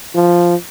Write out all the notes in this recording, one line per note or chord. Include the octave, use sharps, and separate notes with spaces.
F3